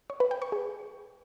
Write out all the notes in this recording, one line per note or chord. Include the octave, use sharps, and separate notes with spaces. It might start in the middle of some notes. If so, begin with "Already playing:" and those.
C#5
B4
G5
C#6
G#4